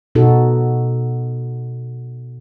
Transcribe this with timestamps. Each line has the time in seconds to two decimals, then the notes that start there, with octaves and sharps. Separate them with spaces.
0.15 B2 D#4 F#4 A4